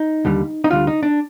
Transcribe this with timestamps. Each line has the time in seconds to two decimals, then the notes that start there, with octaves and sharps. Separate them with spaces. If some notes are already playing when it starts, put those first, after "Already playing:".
Already playing: D#4
0.25 D#2 D3 G3
0.64 D#4
0.71 D2 D3 G3 F4
0.87 D#4
1.03 D4